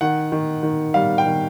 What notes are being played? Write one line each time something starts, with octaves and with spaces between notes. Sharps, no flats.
D#3 F#5
D#3
D#3
G3 F5
G5
D#3